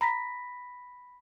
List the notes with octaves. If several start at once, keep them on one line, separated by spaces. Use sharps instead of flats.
A#5 B5 A#6 B6